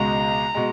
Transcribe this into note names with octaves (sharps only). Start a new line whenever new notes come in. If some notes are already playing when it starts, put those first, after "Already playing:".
Already playing: C#2 B2 G#3 A#5
B2 G#3